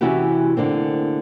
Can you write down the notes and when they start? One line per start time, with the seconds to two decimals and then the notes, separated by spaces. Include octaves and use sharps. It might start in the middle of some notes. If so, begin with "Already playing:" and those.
0.01 C3 E3 C#4 E4 F#4 G4
0.57 A2 D3 A#3 C4